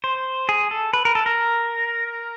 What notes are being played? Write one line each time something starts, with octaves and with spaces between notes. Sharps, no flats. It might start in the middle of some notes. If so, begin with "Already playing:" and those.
C5
G#4
A4
B4
A#4
A4
A#4